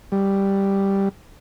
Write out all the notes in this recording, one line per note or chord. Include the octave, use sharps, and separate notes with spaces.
G3